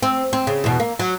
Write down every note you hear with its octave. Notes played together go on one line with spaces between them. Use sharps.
C4
C4
C#3
E2 B2
A#3
F#3